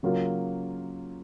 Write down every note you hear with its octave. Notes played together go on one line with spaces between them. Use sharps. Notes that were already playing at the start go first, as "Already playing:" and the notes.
C#3 F#3 A#3 F4